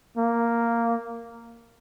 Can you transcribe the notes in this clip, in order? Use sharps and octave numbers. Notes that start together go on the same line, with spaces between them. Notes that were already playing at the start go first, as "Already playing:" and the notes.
A#3